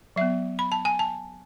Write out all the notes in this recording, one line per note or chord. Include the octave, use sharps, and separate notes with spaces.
F#3 B3 E5
B5
A5
G#5
A5